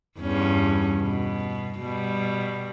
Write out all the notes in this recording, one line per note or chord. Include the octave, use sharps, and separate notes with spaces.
E2 G2 C#4
B2
B2 G3